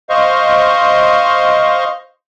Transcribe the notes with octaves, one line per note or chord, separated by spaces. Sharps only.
C5 D#5 F5 C#6